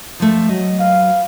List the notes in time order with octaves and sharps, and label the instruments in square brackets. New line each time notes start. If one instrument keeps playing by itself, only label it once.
[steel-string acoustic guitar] F3 A3
[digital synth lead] F#3 [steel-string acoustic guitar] D#5
[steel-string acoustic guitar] B4 [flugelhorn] F5